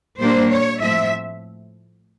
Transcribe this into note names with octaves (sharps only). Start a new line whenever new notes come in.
A#2 G3 A#3 D4 C5
C#5
A2 F3 A3 C4 E5